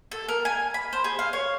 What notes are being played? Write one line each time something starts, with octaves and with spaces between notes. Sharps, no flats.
A4
A#4
G#5
B5
C5
G#4
F5
C#5